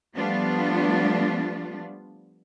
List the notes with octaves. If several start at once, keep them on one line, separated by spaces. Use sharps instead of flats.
F3 G3 A3 B3 D4 F4